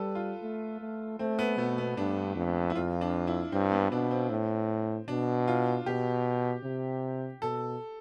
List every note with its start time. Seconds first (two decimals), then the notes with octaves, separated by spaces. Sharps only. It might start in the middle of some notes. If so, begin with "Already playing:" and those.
Already playing: G3 A4 B4
0.15 F4
0.42 A3
0.81 A3
1.19 A3 C4
1.39 B3
1.58 B2 A3
1.78 B3
1.97 G2 D4
2.36 F2
2.70 E4
2.75 F2 F4
3.01 D4
3.27 E4
3.52 G2 C4
3.72 B3
3.92 B2 D4
4.11 C4
4.30 A2
5.08 B2 D4
5.48 F4
5.86 B2 G4
6.64 C3
7.42 B2 A4